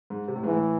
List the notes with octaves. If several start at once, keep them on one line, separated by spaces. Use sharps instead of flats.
G#2
C3
A2
G#2 E3
A2